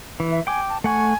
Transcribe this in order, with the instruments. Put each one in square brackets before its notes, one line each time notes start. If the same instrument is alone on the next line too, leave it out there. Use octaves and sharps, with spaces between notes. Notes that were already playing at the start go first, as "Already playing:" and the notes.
[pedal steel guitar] E3
[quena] E5
[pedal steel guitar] G5 D6 [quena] G#5
[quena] A5
[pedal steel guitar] A3 F#5 C#6 [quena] G#5